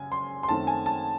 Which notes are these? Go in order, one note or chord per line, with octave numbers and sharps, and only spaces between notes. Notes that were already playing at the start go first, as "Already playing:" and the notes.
Already playing: F#2 C#3 G#5
C6
C6
F#2 D#3 A3 C4 A5
G#5
A5